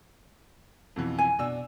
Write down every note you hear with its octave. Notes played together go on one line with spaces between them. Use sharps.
F2 B2 E3
G#5
B2 D4 E6